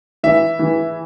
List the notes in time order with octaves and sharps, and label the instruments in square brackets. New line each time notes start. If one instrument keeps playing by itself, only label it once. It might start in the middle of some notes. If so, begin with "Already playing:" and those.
[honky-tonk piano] E3 [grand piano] E5
[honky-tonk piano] E3